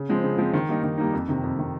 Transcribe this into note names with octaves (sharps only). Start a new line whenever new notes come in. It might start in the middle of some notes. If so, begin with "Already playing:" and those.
Already playing: C#3
F3 G#3 C4
C#3
F3 G#3 C4
D#3
G3 A#3 D#4
D#3
G3 A#3 D#4
F2
C3 D#3
F2
C3 D#3